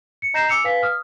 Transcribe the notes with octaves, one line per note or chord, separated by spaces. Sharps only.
C#7
D#5 A#5 G6 A#6 C7 E7
G#5 D6 E6 C#7 F7
B4 F5 G#5 B6
D#6 F6